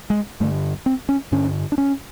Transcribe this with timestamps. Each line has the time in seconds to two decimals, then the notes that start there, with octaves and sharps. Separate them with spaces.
0.10 G#3
0.40 G2 D3 A3
0.86 C4
1.09 C#4
1.32 G2 D3 C#4
1.72 D4
1.78 C#4